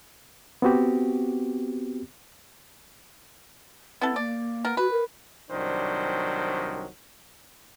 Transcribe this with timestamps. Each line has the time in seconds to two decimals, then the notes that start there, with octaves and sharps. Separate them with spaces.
0.62 B3 C4 F#4 G4
4.01 B3 C4 E4 A4
4.16 A#3 D5
4.65 B3 A#4
4.77 F#4 B4
4.91 A#4
5.51 C2 D#3 F#3 D4 C5